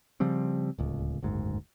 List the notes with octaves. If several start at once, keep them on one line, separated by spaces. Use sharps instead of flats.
C#3 F3 G3 C4
D1 C#2
F#1 D2 G#2